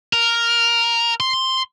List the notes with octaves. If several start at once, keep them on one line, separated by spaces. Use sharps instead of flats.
A#4
C6